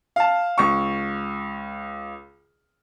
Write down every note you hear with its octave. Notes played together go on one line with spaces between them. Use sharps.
F5 A5
C#2 C#6